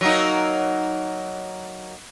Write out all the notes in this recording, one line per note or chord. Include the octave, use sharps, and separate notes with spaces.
F#3 A#3 D#4